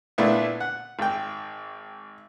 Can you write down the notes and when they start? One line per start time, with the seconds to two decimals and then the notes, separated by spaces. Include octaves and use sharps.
0.18 A#2 A3 B3 D4 E4
0.60 F#5
0.99 G#1 G5